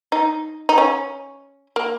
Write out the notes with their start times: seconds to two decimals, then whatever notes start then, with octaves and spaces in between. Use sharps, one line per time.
0.12 D#4
0.69 D#4
0.78 C#4
1.76 A#3